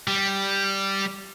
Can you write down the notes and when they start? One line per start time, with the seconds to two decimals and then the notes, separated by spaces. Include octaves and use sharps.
0.08 G3